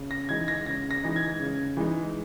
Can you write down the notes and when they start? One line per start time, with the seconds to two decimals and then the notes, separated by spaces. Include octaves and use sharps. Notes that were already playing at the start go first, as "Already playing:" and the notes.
Already playing: C#3
0.11 A#6
0.29 E3 G#3 D#4 G#6
0.48 A#6
0.66 C#3 A#6
0.91 A#6
1.04 E3 G#3 D#4
1.16 G#6
1.40 C#3
1.77 E3 G#3 D#4